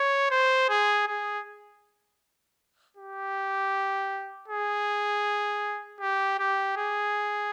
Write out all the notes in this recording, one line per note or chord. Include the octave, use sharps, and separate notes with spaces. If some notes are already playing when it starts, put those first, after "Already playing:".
Already playing: C#5
C5
G#4
G#4
G4
G#4
G4
G4
G#4